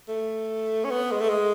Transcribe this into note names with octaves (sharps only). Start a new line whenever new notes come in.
A3
C#4
B3
G#3
A3
G#3